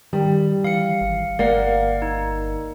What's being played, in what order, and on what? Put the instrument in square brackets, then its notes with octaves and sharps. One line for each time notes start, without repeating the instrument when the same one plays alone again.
[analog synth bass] D#3 [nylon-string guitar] G3
[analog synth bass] E3 [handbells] F5 C#7
[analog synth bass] G#1
[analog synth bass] G1 [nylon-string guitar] A#3 [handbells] D5 F5 F#5
[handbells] D#4